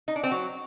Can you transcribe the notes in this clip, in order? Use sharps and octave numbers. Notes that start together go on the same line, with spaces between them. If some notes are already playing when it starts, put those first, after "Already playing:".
D#4
D4
C4
F#3